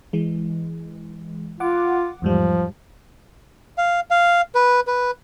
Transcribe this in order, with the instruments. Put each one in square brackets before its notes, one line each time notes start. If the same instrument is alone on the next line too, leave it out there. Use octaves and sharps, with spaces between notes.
[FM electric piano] E3 G#3
[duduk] F4 [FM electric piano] F#5 D6
[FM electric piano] E2 G#2 G3 [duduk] F3
[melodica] F5
F5
B4
B4